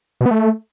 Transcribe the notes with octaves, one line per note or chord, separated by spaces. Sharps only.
B2
B3
A3